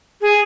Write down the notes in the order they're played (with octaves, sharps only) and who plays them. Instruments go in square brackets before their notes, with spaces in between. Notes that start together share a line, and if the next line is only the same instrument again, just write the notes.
[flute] G#4